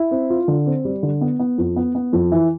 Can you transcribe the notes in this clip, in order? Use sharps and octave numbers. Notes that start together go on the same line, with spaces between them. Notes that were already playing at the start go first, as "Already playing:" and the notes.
Already playing: E4
C4
F4
D3
C4
G3
D3
B3
B3
F2
B3
B3
F2
E3